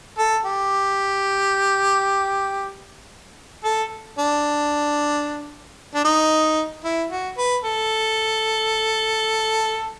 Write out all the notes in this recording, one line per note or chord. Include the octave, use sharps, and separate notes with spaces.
A4
G4
A4
D4
D4
D#4
E4
F#4
B4
A4